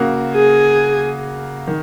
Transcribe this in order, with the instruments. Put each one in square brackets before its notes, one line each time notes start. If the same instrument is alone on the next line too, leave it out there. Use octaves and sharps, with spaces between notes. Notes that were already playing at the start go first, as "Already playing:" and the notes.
Already playing: [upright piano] C#3 A#3 F#4
[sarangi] G#4
[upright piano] D#3